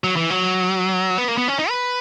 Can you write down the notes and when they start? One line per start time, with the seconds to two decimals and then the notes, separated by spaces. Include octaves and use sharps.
0.04 F#3
0.17 E3
0.30 F#3
1.18 B3
1.28 A#3
1.38 B3
1.48 C#4
1.58 D#4
1.69 B4